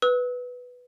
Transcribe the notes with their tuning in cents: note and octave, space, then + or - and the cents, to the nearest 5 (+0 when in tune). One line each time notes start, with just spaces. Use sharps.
B4 +0 E6 -40